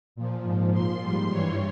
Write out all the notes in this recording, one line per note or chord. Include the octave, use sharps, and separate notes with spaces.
A#2 F3
G#2 F3
A#2 F3 C6
G#2 G3
G2 E3 G3 C#5